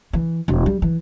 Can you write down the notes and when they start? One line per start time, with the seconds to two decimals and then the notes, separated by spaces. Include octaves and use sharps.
0.13 E3
0.48 E1
0.66 G3
0.82 E3